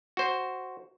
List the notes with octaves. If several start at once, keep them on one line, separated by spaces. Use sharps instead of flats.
F#4 C5